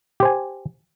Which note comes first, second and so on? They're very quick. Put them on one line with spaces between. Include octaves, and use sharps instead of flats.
G4 C5 G#5